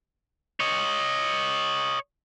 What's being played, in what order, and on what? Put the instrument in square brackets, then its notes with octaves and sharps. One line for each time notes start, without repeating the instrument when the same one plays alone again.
[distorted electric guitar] C#5 D#5